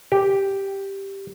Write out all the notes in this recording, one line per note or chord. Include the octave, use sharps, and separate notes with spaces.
G4